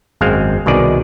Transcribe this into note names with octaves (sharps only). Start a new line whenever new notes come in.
G#1 F#2 G#3 C4 F5
C2 B2 D#3 G#4 D5